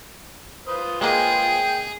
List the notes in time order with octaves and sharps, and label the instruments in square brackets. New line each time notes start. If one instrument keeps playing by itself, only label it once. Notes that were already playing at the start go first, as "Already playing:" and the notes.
[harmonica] F4 B4 C5 [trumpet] D#6
[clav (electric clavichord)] G#3 A#3 [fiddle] G#4 [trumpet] G5